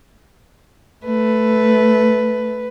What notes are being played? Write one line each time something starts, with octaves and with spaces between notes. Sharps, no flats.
A3 B4